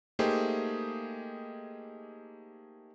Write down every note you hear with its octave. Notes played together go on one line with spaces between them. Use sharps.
A3 A#3 D#4 G4 G#4 C5